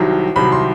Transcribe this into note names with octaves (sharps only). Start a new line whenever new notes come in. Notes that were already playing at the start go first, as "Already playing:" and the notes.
Already playing: C2 C3 D#3 F#3
C2 C3 D#3 F#3 B5
C6